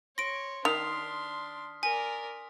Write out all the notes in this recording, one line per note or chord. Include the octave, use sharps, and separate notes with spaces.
C#5 C6 A#6 D7
D#3 D4 C6 D#6 F6 B6 F7
A#4 D5 G#5 B6